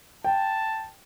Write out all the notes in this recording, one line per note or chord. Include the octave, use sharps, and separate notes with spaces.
G5 A5